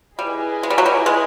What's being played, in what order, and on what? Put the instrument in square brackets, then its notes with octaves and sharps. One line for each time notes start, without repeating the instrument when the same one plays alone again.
[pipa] G3 [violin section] E4 G#4 B4 D#5 G#5
[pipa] G#3
G3
F#3
G3
G#3